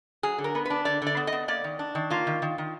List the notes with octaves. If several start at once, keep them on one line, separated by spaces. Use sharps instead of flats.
F#3 G#4
D3
A#4
B3
D4 B4
D3 D5
D3 D5
B3
D#5
B3
A#3 D5
D#3
D4
D#3
A#3 F4
D#3
D#3
D#3